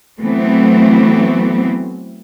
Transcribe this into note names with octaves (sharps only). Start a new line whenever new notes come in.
E3 F#3 A3 B3 C4